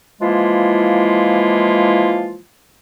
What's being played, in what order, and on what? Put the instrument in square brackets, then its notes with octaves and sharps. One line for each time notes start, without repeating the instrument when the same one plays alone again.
[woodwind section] E3 F3 G#3 A#3 E4 F4